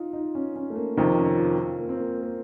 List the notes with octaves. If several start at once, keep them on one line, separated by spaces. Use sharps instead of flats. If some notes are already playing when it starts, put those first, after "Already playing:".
Already playing: D#4 F4
D#4
C#4
C#4
A3
A#3
F2 C3 D#3 C4
C#4
F4
F4
A#3
C4
A#3
A#3